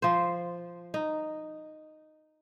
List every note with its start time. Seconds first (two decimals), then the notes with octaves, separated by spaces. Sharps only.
0.02 F3 C5
0.94 D#4